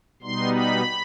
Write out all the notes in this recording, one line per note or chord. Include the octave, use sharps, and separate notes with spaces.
B2 G3 B3 D#4 C6
B5